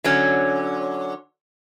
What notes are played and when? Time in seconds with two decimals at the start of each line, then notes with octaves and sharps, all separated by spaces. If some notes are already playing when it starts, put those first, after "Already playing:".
0.04 D3 F#3 C#4